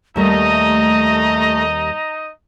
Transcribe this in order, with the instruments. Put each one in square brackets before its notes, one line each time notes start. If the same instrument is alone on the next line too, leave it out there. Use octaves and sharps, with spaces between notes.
[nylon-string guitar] D#2 G3 [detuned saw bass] A3 [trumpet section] D#4 D#5 [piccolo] A#5